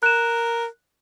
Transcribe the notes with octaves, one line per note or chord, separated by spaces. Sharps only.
A#4 F#6 E7